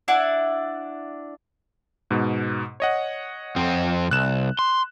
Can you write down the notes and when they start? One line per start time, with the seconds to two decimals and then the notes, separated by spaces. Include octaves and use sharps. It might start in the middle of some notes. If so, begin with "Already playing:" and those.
0.08 D4 E4 F#5
2.11 G#2 B2
2.80 C#5 D#5 F#5
3.56 F2 C4
4.11 C2 F#6 E7
4.59 C6